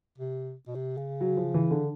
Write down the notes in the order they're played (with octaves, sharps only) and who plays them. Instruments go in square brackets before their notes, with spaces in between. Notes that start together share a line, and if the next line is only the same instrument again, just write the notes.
[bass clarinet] C3
B2
C3
C#3
[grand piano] F#3
F3
E3
D3